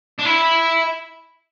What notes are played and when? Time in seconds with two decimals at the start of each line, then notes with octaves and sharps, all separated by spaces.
0.19 D4
0.26 E4